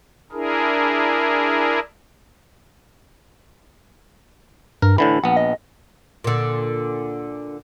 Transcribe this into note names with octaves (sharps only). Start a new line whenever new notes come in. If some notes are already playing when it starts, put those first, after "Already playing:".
D4 E4 G#4 A#4
G2 A#4
A2 D3 E3 B5
A#1 B3 F#5
D#5
A#2 D3